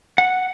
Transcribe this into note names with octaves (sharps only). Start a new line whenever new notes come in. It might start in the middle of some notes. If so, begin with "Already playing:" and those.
F#5